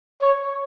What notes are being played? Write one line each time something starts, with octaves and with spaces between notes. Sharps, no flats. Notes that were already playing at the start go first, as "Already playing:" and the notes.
C#5